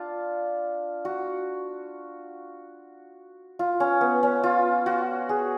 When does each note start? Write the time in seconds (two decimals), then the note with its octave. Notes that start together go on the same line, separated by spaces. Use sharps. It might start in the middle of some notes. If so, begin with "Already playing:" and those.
Already playing: D4 F4
1.05 F#4
3.59 F4
3.80 C#4
4.01 B3
4.23 C#4
4.44 F4
4.86 F#4
5.29 G#4